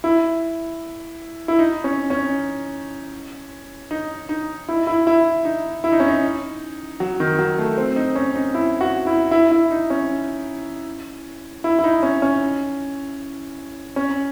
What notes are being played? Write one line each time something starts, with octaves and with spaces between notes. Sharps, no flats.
E4
E4
D#4
C#4
C#4
D#4
D#4
E4
E4
E4
D#4
E4
D#4
C#4
D#4
F#3
D#3
F#3
A3
C4
D#4
C#4
D#4
E4
F#4
E4
E4
E4
D#4
C#4
E4
E4
D#4
C#4
C#4
C#4